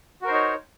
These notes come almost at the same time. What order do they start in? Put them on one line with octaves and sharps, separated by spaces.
F#4 A#4 C5 D#4 C#5